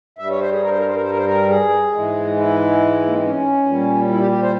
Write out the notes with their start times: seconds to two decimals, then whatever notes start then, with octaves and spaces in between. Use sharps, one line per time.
0.19 G2 G3 E5
0.30 C#5
0.40 C5
0.52 G#4
0.62 A#4
0.70 C5
0.78 A#4
0.87 C5
0.94 A#4
1.02 C5
1.10 A#4
1.17 C5
1.26 A#4
1.49 G#4
1.93 G#2 E3 G#3
2.36 E4
3.06 A#3
3.14 C4
3.22 C#4
3.66 A#2 G3
4.09 E4
4.20 G4
4.31 G4
4.42 C5